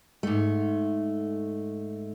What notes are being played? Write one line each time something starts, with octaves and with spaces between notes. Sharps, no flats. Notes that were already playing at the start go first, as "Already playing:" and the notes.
G#2 A3